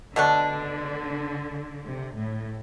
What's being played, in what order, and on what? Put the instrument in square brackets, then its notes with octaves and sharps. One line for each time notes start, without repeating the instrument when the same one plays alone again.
[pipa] B2 A3 D4 [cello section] D3
[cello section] C3
A2